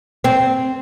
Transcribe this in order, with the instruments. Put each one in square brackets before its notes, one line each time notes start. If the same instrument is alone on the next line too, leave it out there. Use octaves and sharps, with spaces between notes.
[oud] C4